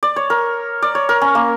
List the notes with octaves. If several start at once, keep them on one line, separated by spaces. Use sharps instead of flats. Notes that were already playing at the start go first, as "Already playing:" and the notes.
D5
C#5
A#4
D5
C#5
A#4
C#4
A#3